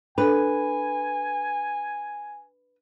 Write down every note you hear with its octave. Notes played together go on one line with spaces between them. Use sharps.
D4 A4 B4 G#5